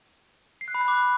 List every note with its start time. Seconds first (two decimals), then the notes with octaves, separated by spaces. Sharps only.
0.61 C7
0.68 F#6
0.75 B5
0.81 F#6
0.88 D6